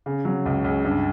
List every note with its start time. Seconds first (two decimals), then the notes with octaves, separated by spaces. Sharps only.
0.06 C#3
0.25 F#3
0.46 C#2
0.64 C#2
0.84 G2